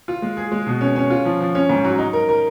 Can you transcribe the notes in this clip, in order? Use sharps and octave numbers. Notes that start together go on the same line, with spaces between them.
F4
G#3
G#4
G#3
B2
C#4
C#4
F4
F3
F3
C#4
G#2
F#3
D#4
A#4
A#4